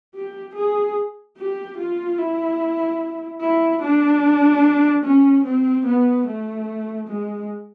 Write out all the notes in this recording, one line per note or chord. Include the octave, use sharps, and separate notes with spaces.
G4
G#4
G4
F4
E4
E4
D4
C#4
C4
B3
A3
G#3